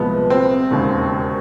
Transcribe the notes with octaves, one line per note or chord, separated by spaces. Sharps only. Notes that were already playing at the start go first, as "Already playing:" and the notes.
Already playing: C2 A#2 F3 G#3 B3
C4
E1 D#2 C#3